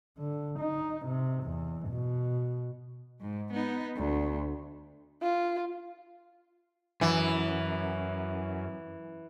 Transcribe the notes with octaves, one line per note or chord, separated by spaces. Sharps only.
D3
D#4
C3
E2
B2
G#2
B3 D#4
D2
F4
F#2 E3